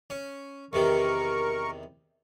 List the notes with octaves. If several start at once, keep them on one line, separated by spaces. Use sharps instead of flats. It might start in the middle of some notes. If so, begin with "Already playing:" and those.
C#4
E2 C3 D#3 A#4 C#6